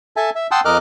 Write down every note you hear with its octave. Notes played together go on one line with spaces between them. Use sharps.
A4 E5 G#5 A5
E5
F#5 G5 A5 C6 D#6 E6
F2 A#4 D#5 D6 F6 F#6